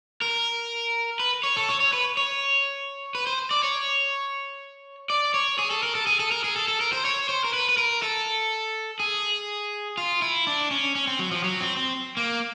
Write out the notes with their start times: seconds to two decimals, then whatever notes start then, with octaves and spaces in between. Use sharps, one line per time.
0.22 A#4
1.20 B4
1.44 C#5
1.57 A4
1.69 C#5
1.80 C#5
1.93 B4
2.17 C#5
3.15 B4
3.27 C5
3.51 D5
3.63 C#5
5.10 D5
5.34 C#5
5.59 G#4
5.70 A4
5.83 A#4
5.95 A4
6.07 G#4
6.20 A4
6.32 A#4
6.44 G#4
6.56 A4
6.68 A4
6.81 A#4
6.93 C5
7.05 C#5
7.29 C5
7.44 A#4
7.54 B4
7.69 B4
7.78 A#4
8.02 A4
9.00 G#4
9.97 F4
10.22 E4
10.47 D4
10.71 C#4
10.95 C#4
11.07 C4
11.19 F#3
11.31 F3
11.44 F#3
11.60 C4
11.77 C4
12.17 A#3